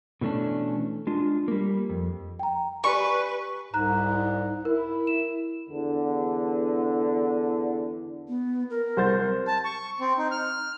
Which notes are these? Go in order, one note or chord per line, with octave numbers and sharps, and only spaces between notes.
B2 E3 A3 C#4 D4
G#3 D4 F4
G3 A#3
F2
G5 A#5
G4 B4 D5 G#5 C#6
C2 G#2 A#5 F#6
E4 A#4
E7
E2 D3
B3
A#4
C2 C5 A6
A5
C#6
C4
D#4
F6